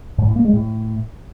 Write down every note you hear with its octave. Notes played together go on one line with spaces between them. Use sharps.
G#2
A2
A#3
G#3
A2